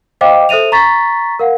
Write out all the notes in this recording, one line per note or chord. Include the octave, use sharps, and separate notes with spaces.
C5 D#5 F5 G5 D6
A4 C5 E5 D#7 F7
A#5 C#6 A6 B6
A#4 F5 F#5